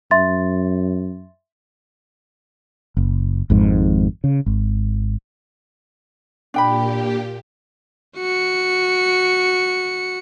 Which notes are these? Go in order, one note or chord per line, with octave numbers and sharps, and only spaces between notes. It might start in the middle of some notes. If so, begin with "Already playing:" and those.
F#2 E5 C6 A6
F#1
G#1 F2 G#2
C#3
G#1
A#2 D4 G4 G5 B5
F#4 C#7